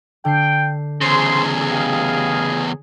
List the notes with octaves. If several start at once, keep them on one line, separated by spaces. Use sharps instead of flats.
D3 G5 G6 C7
E2 C#3 G#4 C5 C6
G4 D#5 F5